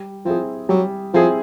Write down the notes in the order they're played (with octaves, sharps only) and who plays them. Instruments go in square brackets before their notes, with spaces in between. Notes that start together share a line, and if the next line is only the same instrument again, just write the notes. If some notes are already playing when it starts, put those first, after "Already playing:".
Already playing: [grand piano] G3
[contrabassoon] F3 [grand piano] C4 E4 G#4
[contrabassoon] F#3 [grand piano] G3
[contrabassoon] F3 [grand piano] C4 E4 G#4